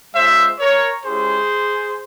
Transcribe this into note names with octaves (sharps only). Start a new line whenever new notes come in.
G#3 C#4 F4 C5 E5
A#4 C#5
G#3 C#4 E4 G4 G#4 C5